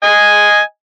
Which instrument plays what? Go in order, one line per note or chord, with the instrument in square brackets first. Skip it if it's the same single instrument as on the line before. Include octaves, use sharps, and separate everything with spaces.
[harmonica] D#5 G#5